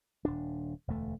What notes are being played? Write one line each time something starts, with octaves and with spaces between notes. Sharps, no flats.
D#1 D4
E1 D2 A3